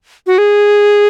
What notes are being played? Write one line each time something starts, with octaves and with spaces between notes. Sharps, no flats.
F#4
G#4